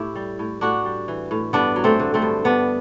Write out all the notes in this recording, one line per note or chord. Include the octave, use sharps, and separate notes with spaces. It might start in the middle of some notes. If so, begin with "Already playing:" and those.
Already playing: A2 E4 G4
G3
A2
A2 D4 F#4
G3
E3
A2
G2 B3 D4
F#3
A3 C4
D3
A3 C4
G2
G2 B3 D4